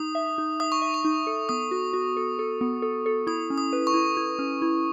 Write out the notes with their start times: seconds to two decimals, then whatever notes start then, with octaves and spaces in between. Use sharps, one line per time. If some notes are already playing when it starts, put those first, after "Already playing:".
Already playing: D#4 D#6
0.15 E5
0.38 D#4
0.60 E5 D#6
0.72 C#6
0.82 E5
0.94 C#6
1.04 D#4
1.27 A4
1.49 B3 D#6
1.71 F#4
1.93 F#4
2.17 A4
2.39 A4
2.61 B3
2.82 A4
3.06 A4
3.27 E4 D#6
3.50 C#4
3.58 D#6
3.73 B4
3.87 C#6
3.94 E4
4.17 E4
4.39 C#4
4.62 E4